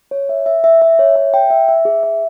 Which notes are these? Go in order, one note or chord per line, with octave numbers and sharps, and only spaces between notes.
C#5
E5
E5
E5
E5
C#5
E5
G5
E5
E5
G#4
E5